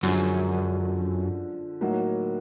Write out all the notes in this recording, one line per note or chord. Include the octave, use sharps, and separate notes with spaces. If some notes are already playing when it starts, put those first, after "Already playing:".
F#2 D3 F3 G#3
A2 F#3 A#3 D#4 F#4